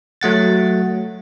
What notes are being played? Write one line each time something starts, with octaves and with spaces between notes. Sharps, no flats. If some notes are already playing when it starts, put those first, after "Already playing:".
F#3 A3 F#5 A6